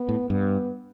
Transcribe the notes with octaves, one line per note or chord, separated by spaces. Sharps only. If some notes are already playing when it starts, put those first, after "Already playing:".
Already playing: B3
A2
G2 B3